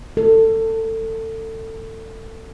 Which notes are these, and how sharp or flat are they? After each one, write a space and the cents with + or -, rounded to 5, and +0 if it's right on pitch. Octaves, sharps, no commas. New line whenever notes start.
A4 +25